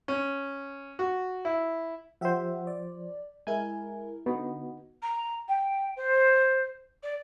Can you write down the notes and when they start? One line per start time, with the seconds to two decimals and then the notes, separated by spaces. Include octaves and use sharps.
0.08 C#4
0.99 F#4
1.45 E4
2.21 F3 G4 C5 E5 F#5
2.67 D5
3.47 G#3 E4 A#4 G#5
4.26 D3 B3 D#4 F#4
5.02 A#5
5.48 G5
5.96 C5
7.03 D5